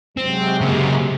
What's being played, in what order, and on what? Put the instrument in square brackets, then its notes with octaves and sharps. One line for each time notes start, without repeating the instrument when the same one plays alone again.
[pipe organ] C3 F#3 G#3 [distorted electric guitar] C4
[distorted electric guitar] C#3 A#3